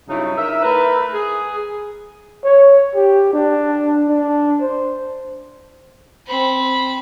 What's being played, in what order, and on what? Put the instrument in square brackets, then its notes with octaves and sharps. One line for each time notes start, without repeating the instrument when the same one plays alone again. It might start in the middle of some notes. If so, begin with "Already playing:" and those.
[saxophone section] G2 C#3 F#3 D#4 E4
D#4 A#4 E5
A3 E4 A#4 B4
G#4
[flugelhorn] C#5
G4
D4
D4
C5
[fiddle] C4 B5